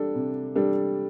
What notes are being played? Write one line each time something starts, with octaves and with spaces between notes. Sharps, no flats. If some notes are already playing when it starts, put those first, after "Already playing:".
Already playing: G3 D4 A4
C3
G3 D4 A4